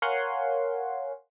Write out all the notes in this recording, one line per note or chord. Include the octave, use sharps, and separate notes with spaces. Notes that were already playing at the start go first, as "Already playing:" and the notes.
A#4 C#5 F5 F#5 G#5 C6